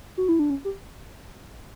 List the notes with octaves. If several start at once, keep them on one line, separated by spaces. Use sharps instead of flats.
F#4
E4
D4
C#4
G4